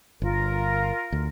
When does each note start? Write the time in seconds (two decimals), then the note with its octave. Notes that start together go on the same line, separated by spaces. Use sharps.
0.22 G1 F4 A#4
1.12 D2